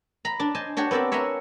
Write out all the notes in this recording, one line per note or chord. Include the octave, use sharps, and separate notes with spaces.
A#5 B5
D4 D5
C5 D#5 G#5 A5
D4 F#4 G4 C#5
B3 C4 A#4 D5 E5
C#5 E5 F#5 G#5 A#5 C6